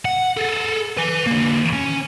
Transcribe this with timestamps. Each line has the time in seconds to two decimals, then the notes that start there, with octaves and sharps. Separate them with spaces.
0.05 F#5
0.37 G#4 A4
0.97 B4 G#5
1.27 D3 A#3
1.73 C#4